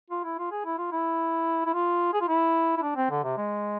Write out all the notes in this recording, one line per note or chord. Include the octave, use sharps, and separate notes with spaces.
F4
E4
F4
G#4
E4
F4
E4
E4
F4
G#4
F4
E4
E4
D4
C4
D3
C3
G#3